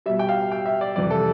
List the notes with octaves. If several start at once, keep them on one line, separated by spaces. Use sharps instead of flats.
B2 G3 E5
G5
F5
G5
E5
D5
F2 C3 E3 G3 D5
A4